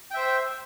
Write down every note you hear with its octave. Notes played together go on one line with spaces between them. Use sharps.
C5 E5 G5